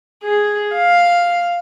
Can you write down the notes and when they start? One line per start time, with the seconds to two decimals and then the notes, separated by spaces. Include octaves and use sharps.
0.23 G#4
0.75 F5